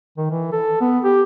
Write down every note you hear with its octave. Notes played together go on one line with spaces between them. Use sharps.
D#3
E3
A4
B3
G4